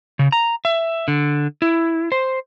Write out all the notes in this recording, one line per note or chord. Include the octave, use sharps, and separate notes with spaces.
C#3
A#5
E5
D3
E4
C5